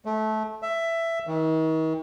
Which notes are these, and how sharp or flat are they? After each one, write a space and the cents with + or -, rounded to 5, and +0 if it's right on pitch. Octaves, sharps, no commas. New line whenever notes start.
A3 -20
E5 +10
D#3 +40